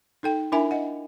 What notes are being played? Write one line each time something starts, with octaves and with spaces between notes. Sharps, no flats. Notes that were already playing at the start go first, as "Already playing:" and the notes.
D#4 A4 G5
D4 E4 A#4 E5 G#5 B5
D#5 F#5